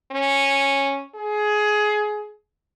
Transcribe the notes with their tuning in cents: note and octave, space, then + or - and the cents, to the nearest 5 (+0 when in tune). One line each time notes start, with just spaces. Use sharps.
C#4 -10
G#4 +20